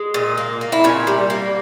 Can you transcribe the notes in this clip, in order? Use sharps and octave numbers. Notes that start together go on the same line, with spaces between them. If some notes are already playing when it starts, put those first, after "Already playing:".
Already playing: G#3
A#2
A#3
A#3
E4
A#2 C#4
G3
A#3